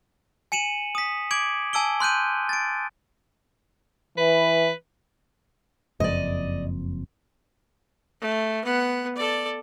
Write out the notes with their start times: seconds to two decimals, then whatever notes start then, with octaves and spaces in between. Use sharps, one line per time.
0.52 G#5 C#7 D#7 E7 F#7
0.95 D#6 B6
1.31 D6 G#6 D7 F#7
1.73 G#5 A5 E6 D7 G7
2.00 C6 F#6 G6 D#7
2.49 A6 D7
4.18 E3 B4
6.00 F#1 F2 D5 D#5
8.21 A3
8.65 B3 F#5
9.15 A4 D5